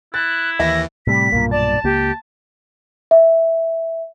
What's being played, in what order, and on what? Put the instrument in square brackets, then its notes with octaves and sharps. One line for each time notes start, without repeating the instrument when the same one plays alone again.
[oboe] E4 [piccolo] F#6 [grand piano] A6
[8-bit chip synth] D#2 E3 [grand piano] E5 [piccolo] A#6
[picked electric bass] A2 C3 [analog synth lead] G3 [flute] B6
[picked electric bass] B1 G2 A#2 [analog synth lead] A#3
[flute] D5 [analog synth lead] A5
[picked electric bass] C#2 A#3 [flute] G4
[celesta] E5